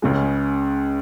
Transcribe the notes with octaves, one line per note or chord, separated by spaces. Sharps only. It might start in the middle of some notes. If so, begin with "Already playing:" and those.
C#2 C#3 G#3